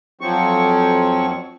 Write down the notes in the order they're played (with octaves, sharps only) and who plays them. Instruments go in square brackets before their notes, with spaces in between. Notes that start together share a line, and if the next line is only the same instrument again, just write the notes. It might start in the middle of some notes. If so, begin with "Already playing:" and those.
[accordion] F2 F3 F#3 C4 C#6